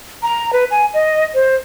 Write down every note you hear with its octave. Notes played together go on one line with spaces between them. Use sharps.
A#5
B4
G#5
D#5
C5